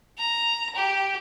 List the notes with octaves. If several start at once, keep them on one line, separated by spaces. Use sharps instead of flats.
A#5
G4